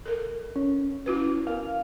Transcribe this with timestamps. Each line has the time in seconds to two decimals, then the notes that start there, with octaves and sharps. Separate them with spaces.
0.06 A4 A#4
0.56 C#4
1.06 E4 F#4 B4
1.47 B3 A#4 F5